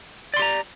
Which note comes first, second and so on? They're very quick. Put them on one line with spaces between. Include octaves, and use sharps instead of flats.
D5 C6 G4 A#5